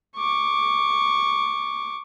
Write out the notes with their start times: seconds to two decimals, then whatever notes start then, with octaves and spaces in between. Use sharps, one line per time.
0.17 C#6 D6